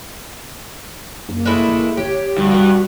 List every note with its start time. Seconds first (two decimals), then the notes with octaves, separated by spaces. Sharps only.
1.29 F#2 A#3
1.45 G#3 A3 E4
1.68 A1
1.97 G1 G4 C#5
2.37 D2 G2 F#4
2.51 D#1 A#3 B3